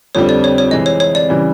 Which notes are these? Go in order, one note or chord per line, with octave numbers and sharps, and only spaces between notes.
F2 D3 G3 C4 C#5
D5
C#5
C#5
C3 E3 G#3 C4 D#5
C#5
C#5
D5
C#3 E3 G3